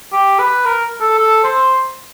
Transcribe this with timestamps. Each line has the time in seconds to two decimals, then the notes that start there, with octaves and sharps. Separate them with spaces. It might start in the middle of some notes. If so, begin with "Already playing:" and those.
0.13 G4
0.39 B4
0.66 A#4
1.01 A4
1.18 A4
1.44 C5